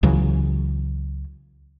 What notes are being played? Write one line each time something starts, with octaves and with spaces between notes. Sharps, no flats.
C#2 C#3 E3 F#3